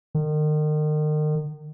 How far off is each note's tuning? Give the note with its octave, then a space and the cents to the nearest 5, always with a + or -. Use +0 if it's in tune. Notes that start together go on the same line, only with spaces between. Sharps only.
D#3 -35